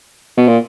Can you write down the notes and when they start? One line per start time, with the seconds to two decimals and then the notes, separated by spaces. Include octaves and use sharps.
0.38 B2
0.48 A#2